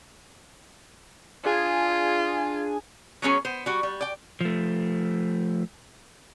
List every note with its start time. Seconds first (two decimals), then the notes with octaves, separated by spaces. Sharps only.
1.45 D4 F4 G#4 G#5
3.22 F#3 B3 C#4 G#4
3.45 B3 C5
3.66 G3 F#4
3.83 G3
4.01 D5 G5
4.41 F3 A3